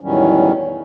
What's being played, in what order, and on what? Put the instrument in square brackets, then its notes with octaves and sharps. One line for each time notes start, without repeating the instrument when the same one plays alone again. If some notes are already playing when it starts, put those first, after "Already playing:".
[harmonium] E2 A2 D#3 F#3 G3 C#4